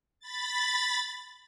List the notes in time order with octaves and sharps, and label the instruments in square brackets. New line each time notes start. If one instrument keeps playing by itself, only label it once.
[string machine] B5 A6